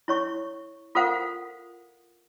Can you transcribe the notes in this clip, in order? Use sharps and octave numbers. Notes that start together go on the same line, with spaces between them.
E4 C#5 C#6
F4 A4 A#4 C5 F5 F#5